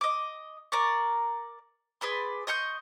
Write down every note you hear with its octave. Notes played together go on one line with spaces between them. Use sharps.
D#5 D6
A#4 D5 C#6
G#4 B4 D5 C6
D#5 C6 C#6 G6